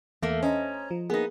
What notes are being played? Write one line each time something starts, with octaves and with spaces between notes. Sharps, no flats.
E2 A3 A#3
C#4 C5 D#5 A#5
F3
A#3 B3 D#4 G#4